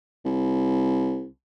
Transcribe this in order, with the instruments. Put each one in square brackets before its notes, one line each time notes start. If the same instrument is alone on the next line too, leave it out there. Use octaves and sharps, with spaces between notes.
[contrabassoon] C2